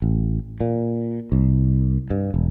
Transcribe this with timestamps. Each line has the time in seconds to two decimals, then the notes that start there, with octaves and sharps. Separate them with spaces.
0.02 A1
0.60 A#2
1.32 C2
2.10 G2
2.34 E1